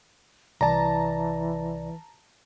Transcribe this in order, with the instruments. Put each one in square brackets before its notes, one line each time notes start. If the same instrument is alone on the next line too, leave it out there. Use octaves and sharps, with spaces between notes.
[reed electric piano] C2 D5 [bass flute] E3 [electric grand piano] A5 A#5